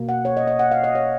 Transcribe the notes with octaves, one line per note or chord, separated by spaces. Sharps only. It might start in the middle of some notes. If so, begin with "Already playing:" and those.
Already playing: B2 A#3
F#5
C#5
D#5
D#5
F#5
F5
D#5
C#5